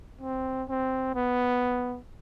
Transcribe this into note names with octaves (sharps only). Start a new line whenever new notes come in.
C4
C4
B3